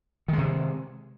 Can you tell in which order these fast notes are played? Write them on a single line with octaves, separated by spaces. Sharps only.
D#3 G#3 C3